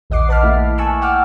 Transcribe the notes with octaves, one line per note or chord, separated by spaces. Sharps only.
A#1 D#2 D#5 F#5 D6 C7
B4 A5 B5 F6
A3 A#3 E4
G#5 A5 C#6 E6 F#6
F#5 G5 D6 E6 F6